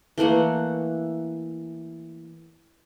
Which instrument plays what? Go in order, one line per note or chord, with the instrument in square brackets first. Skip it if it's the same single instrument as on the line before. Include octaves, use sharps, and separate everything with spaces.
[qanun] E3 A3 A#3 F#5